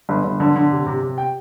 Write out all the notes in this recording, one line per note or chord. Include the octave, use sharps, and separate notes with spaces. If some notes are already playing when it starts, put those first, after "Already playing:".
G1
G1
D3
D3
C3
C3
C3
G5